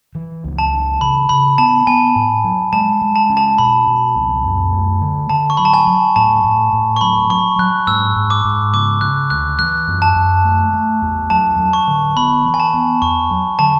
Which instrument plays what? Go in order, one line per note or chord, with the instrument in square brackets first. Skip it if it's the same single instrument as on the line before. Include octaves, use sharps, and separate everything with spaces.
[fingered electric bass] E3
C#2
[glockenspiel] A5
[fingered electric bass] E3
[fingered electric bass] C#3 [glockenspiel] B5
[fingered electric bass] C#3 [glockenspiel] B5
[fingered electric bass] B3 [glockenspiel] A5
[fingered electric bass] B3 [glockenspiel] G#5
[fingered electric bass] A2
F#3
[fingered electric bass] G#3 [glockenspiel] A5
[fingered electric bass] G#3
[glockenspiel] A5
[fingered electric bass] C#4
[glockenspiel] A5
[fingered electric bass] B2 [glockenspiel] B5
[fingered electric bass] B2
C#2
F#2
A3
D3
[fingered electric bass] D3 [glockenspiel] A5
[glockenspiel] C#6
[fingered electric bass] F#3 [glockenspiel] B5
[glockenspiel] A5
G#5
[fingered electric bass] F#3
[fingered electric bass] A2 [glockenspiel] A5
[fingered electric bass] A2
A2
[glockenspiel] C#6
[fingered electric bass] F#3 [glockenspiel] B5
[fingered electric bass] F#3 [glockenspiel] C#6
[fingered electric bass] F#3 [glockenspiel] F#6
[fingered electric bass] G#2 [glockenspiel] E6
[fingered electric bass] G#2
[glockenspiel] D6
[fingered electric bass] G#2
[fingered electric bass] C#3 [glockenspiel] D6
[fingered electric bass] C#3 [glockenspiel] F#6
[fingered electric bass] D2 [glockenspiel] F#6
[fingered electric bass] E3 [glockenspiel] F#6
[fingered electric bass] F#2
[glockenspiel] A5
[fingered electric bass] F#2
A3
A3
E2
[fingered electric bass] F#3 [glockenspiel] A5
[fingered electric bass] F#3
[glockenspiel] C#6
[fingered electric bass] D3
[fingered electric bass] B3 [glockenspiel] B5
[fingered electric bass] E3
[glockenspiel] G#5
A5
[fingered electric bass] B3
[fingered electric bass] E2 [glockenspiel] C#6
[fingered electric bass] F#3
[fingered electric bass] D3 [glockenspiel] A5